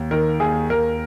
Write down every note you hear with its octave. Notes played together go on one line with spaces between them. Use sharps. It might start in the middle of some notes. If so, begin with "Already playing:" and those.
Already playing: D#2
D#3 A#4
D#2 G#4
D#2 A#4